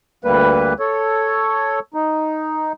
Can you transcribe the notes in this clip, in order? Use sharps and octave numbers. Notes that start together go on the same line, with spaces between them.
D2 G3 A#3 B4
A4 C#5
D#4